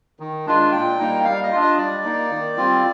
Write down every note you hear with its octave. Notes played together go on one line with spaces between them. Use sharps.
D#3
G#3 D4 F4
A#2 G5
G3 A#3 D#4
G3 F5
D#5
D4 F4
D#5
G3 D5
A#3 D#4
D#3
G3 C4 F4